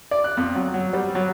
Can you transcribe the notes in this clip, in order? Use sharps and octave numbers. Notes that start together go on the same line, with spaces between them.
D5
F#6
F2
F#3
F#3
G3
F#3